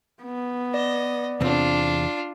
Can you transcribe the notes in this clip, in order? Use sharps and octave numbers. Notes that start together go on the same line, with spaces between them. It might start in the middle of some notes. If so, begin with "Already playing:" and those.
B3
D5 D#5
E2 C3 C4 D4 F4